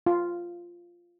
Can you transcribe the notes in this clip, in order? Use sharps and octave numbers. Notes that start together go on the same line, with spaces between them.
F4